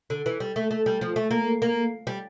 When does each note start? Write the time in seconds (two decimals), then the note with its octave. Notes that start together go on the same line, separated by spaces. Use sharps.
0.10 D3
0.26 E3
0.40 G3
0.56 A3
0.71 A3
0.86 G3
1.01 F3
1.16 A3
1.31 A#3
1.62 A#3
2.07 G3